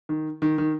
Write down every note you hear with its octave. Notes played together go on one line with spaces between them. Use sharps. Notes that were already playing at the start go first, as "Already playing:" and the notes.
D#3
D#3
D#3